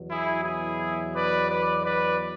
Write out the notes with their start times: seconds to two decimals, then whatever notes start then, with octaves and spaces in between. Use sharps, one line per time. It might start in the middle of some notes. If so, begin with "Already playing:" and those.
Already playing: E2 B2 F#3
0.08 E4 G#4
0.43 E4 G#4
1.13 B4 D5
1.48 B4 D5
1.83 B4 D5